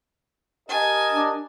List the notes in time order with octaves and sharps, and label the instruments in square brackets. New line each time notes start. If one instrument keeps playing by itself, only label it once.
[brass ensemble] G4 A#4 D#5 [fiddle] G#5 A5
[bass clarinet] D4